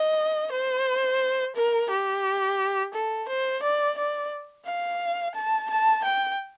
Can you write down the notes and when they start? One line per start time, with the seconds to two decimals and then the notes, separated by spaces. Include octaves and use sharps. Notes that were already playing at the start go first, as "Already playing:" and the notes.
Already playing: D#5
0.52 C5
1.56 A#4
1.91 G4
2.94 A4
3.29 C5
3.63 D5
3.98 D5
4.66 F5
5.35 A5
5.70 A5
6.04 G5